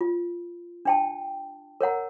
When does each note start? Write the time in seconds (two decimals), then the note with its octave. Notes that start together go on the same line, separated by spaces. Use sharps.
0.01 F4
0.85 D4 G5 A5
1.81 A#4 C#5 F#5 A#5